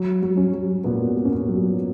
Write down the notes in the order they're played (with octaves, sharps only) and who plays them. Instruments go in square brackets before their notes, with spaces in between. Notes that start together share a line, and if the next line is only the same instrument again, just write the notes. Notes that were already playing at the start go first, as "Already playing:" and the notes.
Already playing: [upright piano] F#3
F#3
C#4
F#3
A#2 B3
A#2
C#4
B3
F#3